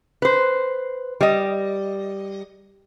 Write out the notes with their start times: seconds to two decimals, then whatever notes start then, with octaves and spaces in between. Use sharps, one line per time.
0.22 B4 C5
1.21 G3 D#5